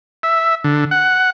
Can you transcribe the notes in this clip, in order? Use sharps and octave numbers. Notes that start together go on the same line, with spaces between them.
E5
D3
F#5